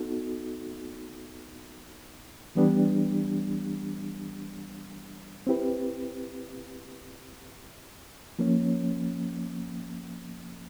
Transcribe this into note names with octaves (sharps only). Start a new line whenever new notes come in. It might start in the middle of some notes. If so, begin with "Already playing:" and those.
Already playing: B3 D#4 F#4 A4
E3 G3 B3 D4 G4
C4 E4 G4 B4
F3 A#3 C#4